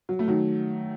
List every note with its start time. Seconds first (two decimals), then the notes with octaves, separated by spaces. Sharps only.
0.09 F#3
0.19 A3
0.28 D#3 F#3